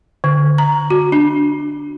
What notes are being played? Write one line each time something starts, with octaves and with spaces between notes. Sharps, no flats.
D3
A#5
F#4
D4